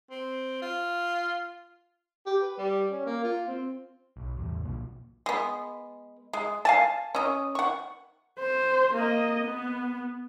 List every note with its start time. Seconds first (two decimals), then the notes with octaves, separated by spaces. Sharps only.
0.11 C4
0.62 F4
2.26 G4
2.42 B4
2.58 G3
2.91 C#4
3.06 A#3
3.24 F4
3.47 C4
4.17 B1
4.37 A1 E2
4.63 B1 A#2
5.26 G#3 B3
6.33 G#3
6.65 F5 G#5 A5
7.15 C#4 D#5
7.55 F#5 C#6
8.39 C5
8.94 A#3 D#5
9.43 B3